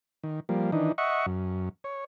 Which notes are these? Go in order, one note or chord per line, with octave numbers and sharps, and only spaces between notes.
D#3
F3 G3 A#3
D#3 E3 D4 D#4
D#5 E5 F#5 C#6
F#2
C#5